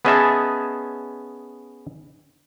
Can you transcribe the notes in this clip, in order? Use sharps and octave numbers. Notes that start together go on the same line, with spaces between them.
B3 C#4 G#4 D#5 E5 A5